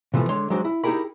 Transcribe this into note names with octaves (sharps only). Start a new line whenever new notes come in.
C3 E3 F3 A3 B3
D3 G#3 C#5 C6
F#3 G#3 D4 F#4 C5
E4
D#4 E4 G4 G#4 A#4 B5